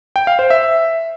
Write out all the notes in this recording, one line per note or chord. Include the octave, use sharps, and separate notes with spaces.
G5
F5
C5
E5